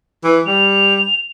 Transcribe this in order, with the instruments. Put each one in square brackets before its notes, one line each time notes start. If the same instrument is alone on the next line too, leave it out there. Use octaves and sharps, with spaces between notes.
[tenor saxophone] E3
[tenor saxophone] G3 [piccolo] F7